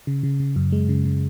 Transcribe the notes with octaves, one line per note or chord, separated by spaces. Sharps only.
C#3
C#3
C#3
F#2
G#3
C#3
C#3